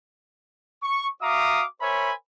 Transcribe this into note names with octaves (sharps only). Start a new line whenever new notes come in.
C#6
F#4 E5 F5 A#5 D6 D#6
A#4 C5 C#5 E5 G#5 B5